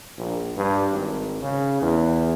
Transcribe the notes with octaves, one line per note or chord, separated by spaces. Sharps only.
A#1
G2
G#1
C#3
E2